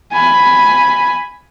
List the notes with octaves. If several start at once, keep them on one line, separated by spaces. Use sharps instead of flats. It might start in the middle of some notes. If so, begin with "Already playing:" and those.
G#5 B5